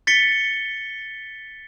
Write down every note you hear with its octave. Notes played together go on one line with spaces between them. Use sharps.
A6 B6 C#7 G7